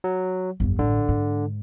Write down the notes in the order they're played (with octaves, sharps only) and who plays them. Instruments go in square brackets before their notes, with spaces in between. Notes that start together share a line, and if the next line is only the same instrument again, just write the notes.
[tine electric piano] F#3
[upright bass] G1 F2
[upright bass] A1 [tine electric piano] D3
[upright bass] G#2